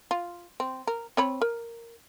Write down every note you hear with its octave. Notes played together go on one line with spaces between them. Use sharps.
F4
C4
A#4
C4 C#5 B5
A#4